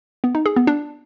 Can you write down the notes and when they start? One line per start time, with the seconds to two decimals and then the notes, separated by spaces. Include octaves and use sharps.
0.24 B3
0.35 D#4
0.46 G#4
0.56 B3
0.67 D4